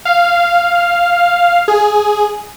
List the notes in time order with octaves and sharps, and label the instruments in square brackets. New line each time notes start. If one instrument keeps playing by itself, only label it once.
[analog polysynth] F5
G#4